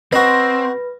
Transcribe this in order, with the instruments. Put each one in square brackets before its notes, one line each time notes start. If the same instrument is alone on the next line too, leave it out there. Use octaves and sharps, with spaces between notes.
[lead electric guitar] C4 [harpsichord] F#4 D#5 [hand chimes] B4 [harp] A#6